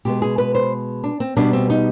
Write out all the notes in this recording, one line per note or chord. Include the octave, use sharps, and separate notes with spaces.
B2 G#3 B3 G4
G#4
B4
C5
D4
C4
B2 G3 B3 D4
C4
D#4